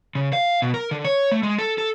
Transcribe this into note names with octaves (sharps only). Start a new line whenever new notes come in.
C#3
F5
B2
A#4
D3
C#5
A3
G#3
A4
A4